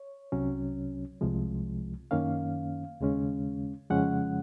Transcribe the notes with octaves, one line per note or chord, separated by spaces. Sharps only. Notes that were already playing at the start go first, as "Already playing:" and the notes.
Already playing: C#5
C2 C3 F#3 C#4
C2 C3 F3 G#3
F#2 D#3 A#3 C#4 F5
D#2 C#3 G#3 C#4
F2 C#3 F3 G#3 C#4 F#5